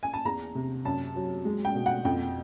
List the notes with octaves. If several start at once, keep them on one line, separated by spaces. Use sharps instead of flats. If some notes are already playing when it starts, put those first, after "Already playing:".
G#5
A5
E2 A#5
C3
F#2 A5
F#3
G#3
G5
B2
F#5
F2 G5